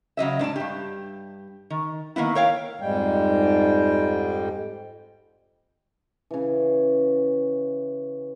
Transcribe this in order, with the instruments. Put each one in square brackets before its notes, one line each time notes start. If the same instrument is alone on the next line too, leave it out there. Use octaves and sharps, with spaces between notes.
[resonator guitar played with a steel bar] C#3 F#3 D#5 E5
G#2 D4 C#5 A5
G2 G4
D#3
D#3 A#3 B3 E4
A#4 C#5 F5 G5
[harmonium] F2 G#2 G3 G#3 G5
[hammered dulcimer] C#3 E3